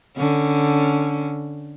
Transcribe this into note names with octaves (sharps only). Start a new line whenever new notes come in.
D3 C#4